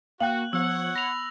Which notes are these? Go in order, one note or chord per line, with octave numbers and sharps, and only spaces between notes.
A#3 F#4 F5 G5 F#6 F#7
F3 B3 C#5 F#5 E6
B5 A#6 F7